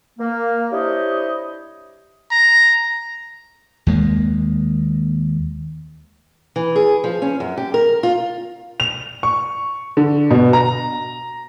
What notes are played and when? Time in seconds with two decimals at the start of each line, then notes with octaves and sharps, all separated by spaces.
0.19 A#3
0.72 D4 E4 G4 C5 C#5 D#5
2.32 A#5
3.87 D#2 G#3 A#3
6.56 E3
6.76 G#4
7.04 F3
7.22 C#4
7.40 F#2
7.57 G4
7.74 A#4
8.03 F4
8.80 F7
9.23 C#6
9.97 D3
10.31 B2
10.53 A#5